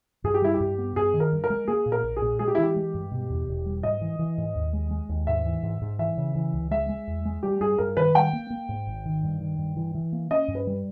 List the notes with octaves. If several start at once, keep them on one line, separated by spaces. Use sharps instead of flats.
G2 G#4
G4
G3 E4
G4
G2
B3
G2 G#4
D#3
A#4
G2
A#4
G#3
A#3 G#4
A#2
A#4
A#1
G#4
A#2
G#3 G#4
G4
E4
E3
G4
G#3
G2
B2
E2
E1
G3
G#2 D#5
E3
E3
G#2
D#2
G#3
G#3
D#2
G#2 E5
E3
G#2
G#2
E3 E5
C#3
E3
C#2
G#3 E5
G#3
E2
G#3
G3 G4
G2 G#4
G2 A#4
D#3 B4
G3 G5
A#3
A#3
G#2
G#1
D#3
G2
D#3
G2
E3
E3
A#3
C#4 D#5
G2
B4
G3